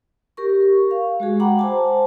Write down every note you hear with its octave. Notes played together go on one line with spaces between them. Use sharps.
G4 A#4 C#6
F5
G#3 F#4 G#4
F#5 G5 A#5 B5 D6
C5 G#5 A5